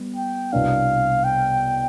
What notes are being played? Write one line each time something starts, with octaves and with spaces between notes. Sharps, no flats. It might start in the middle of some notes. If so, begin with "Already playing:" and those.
Already playing: G3 B3
G5
C2 B2 B3 D4 F5
G5